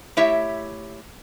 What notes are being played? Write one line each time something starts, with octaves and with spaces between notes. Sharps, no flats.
A3 E4 G4 C#5 E5